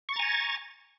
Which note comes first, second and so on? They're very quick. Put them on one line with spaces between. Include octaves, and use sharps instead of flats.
C#6 A6 A#5 G#5